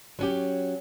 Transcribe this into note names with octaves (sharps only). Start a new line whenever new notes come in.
F#3 C#4 G4